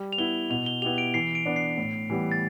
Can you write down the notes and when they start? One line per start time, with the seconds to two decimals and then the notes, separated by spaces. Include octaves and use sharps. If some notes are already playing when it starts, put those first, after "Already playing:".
Already playing: G3
0.12 F7
0.18 B3 E4 G7
0.50 B2 F7
0.66 G7
0.82 B3 E4 G4 F7
0.98 D7
1.14 E3 C7
1.35 D7
1.46 B3 D4
1.56 C7
1.78 A2
2.10 E3 G3 B3
2.31 A6